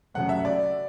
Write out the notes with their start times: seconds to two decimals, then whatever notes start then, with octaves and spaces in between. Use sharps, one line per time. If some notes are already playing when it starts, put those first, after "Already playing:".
0.14 F#2 C#3 F#3 A3 F#5
0.29 E5
0.45 D5